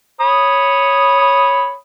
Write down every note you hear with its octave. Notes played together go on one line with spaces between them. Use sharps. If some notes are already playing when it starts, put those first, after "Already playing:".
C#5 B5 D#6